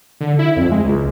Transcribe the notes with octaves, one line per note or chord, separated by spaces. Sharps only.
D3
E4
F2
G#3
C#2